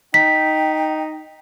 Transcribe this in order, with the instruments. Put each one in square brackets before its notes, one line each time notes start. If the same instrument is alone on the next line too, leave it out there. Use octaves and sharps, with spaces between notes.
[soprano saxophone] D#4 [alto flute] G5 [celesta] B6